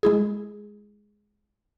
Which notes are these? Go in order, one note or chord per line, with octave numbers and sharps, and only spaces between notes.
G#3 E4 G#4